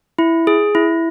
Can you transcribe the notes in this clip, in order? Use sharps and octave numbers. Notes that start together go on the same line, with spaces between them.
E4
G#4
E4